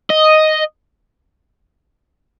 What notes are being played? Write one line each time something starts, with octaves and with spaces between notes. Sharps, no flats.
D#5